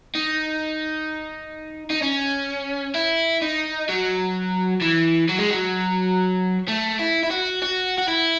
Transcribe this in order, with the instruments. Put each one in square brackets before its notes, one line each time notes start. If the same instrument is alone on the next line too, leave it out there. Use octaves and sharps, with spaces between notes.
[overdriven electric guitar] D#4
D#4
C#4
E4
D#4
F#3
E3
F#3
G#3
F#3
A3
E4
E4
F#4
F#4
F#4
E4